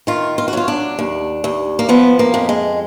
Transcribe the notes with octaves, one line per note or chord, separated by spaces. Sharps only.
D#3 F4
F4
F#4
F#3 F4
D4
D#2
D#2
A#3
F3 B3
A#3
F2
G#3